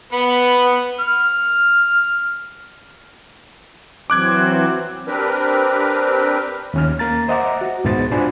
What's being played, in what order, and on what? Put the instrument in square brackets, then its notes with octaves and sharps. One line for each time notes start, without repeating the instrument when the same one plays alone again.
[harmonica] B3 B4
F6
[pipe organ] E3 F#3 C4 [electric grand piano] D6 F#6 G#6
[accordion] C4 D4 G4 A#4 B4
[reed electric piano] D#2 C#4 F6
A#3 A#5 A6
C5 D#5 E5 F#5 A#5 D6
F#4
C#2 G#2 B2 B3 C5 A6
D4 F4 F#4 C5 G#5 B5